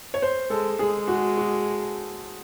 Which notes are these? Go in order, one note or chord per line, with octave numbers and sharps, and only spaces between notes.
C#5
C5
G#3 A4
G#3 G#4
F#4
F#4